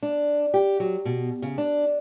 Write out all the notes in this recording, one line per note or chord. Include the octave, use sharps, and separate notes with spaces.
D4
G4
F#3
B2
C#3
D4